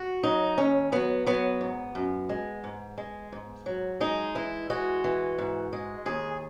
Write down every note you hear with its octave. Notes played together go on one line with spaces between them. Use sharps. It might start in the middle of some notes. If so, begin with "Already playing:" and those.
Already playing: F#4
F#3 D#4
D#2 C#4
F#3 B3
F#3 B3
G#2
F#2
G#3
G#2
G#3
G#2
F#3
G#3 D#4
E3 E4
G#3 F#4
E3
G#2
G#3
D#2 G#4